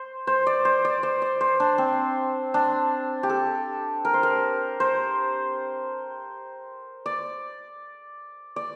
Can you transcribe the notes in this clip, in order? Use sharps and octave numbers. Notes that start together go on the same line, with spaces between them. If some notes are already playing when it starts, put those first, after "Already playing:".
Already playing: C5
C5
D5
C5
D5
C5
D5
C5
D4
C4
D4
G4
A4
A#4
C5
A#4
C5
D5
D5